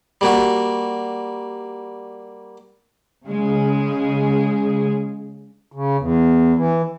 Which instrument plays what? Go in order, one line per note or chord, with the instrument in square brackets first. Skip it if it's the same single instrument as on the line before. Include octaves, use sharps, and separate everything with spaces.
[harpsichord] G3 A#3 F#4
[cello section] C#3 G#3 G#4
[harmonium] C#3
E2
E3